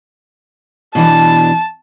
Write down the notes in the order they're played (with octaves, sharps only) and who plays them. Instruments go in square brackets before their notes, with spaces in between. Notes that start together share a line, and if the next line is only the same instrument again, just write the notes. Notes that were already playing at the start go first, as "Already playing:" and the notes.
[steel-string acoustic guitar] B2 E3 D4 [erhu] A5